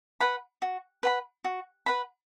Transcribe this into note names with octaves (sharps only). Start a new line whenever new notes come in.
B4 F#5 B5
F#4
B4 F#5 B5
F#4
B4 F#5 B5